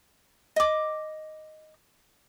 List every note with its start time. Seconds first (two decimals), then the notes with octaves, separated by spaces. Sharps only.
0.56 D#5 D6